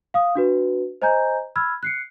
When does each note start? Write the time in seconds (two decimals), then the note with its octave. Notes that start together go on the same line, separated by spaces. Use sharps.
0.14 F5 D#6
0.35 D4 F#4 B4
1.02 C5 D#5 G#5 A#5 G6
1.56 B5 E6 F6 G#6
1.83 F#6 C7 C#7